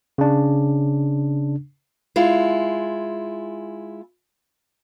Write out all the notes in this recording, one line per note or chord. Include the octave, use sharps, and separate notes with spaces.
C#3 D4
G#3 E4 F4